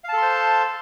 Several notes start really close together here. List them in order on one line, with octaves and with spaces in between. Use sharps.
F5 A5 A4 C6 C5